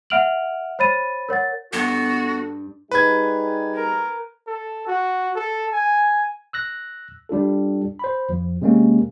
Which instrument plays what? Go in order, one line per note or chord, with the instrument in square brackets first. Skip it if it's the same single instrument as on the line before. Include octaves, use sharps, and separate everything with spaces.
[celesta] E5 F#5 F6 D7 F7 F#7
C5 C#5 B5 A6 D#7
A#4 C#5 F#5 A6
[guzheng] G2 [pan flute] B3 [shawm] F#4 [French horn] A4
[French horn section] G3 D#4 G#4 [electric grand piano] B4 G#6
[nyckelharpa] A#4
[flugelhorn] A4
F#4
A4
G#5
[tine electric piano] E6 F#6 A#6
G3 D4 F4 A4
C5 B5
F2 F3
C3 G#3 A#3 C#4